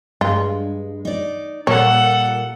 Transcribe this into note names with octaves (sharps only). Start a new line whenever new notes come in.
G2 G#3 F4
D#4 D5
A#2 G3 A#3 A4 C#5 F#5